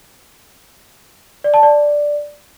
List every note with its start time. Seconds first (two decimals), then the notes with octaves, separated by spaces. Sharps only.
1.44 D5
1.54 A5
1.63 D5